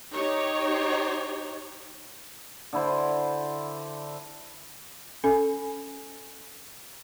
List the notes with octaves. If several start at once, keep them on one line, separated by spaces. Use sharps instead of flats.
D#4 G4 C#5
D3 E4 C5
C#4 A4 G#5